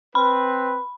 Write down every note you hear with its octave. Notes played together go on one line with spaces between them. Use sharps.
C4 B4 B5